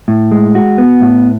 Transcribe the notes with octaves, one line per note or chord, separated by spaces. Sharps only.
A2
G#3
F#4
B3
A2